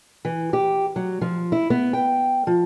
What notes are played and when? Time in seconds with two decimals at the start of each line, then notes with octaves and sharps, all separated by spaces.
0.25 E3
0.53 G4
0.96 F#3
1.21 F3
1.52 E4
1.70 B3
1.93 G5
2.47 F3